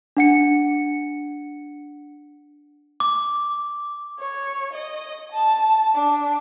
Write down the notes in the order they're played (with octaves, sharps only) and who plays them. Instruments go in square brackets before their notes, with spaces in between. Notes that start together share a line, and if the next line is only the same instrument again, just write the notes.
[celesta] D4 F#5 C#7
[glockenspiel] D6
[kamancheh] C#5
D#5
A5
D4